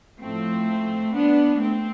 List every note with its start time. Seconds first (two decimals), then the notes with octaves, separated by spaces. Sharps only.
0.20 A2 F3 A3 C4
1.14 B3 D4
1.61 A3 C4